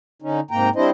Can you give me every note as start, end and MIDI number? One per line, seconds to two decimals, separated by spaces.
0.22 0.40 50
0.22 0.40 61
0.22 0.40 63
0.51 0.69 44
0.51 0.69 48
0.51 0.69 58
0.51 0.69 79
0.51 0.69 82
0.76 0.90 55
0.76 0.90 60
0.76 0.90 62
0.76 0.90 64
0.76 0.90 72
0.76 0.90 75